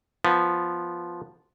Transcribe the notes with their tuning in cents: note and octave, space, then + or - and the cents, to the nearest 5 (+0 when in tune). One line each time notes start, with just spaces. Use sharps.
F3 +0 B3 +0